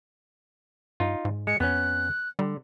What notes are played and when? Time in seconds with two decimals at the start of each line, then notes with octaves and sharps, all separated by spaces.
1.00 G2 D#4 F4
1.25 G#2
1.47 G#3 C#7
1.60 F2 B3 C#4 F#6
2.39 D3 G3